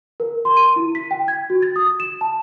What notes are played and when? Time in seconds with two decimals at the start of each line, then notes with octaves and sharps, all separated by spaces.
0.20 A#4
0.45 C6
0.57 D#7
0.76 E4
0.95 B6
1.11 G5
1.28 G#6
1.50 F#4
1.63 A6
1.76 D#6
2.00 E7
2.21 A5